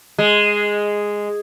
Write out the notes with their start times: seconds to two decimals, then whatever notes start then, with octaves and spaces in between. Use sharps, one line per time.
0.18 G#3